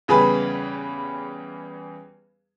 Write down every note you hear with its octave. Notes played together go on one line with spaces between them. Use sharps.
E2 C#3 G3 G#4 B4 B5